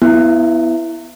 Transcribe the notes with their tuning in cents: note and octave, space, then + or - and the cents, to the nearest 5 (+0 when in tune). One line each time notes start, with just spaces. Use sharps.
B3 +0 E4 +0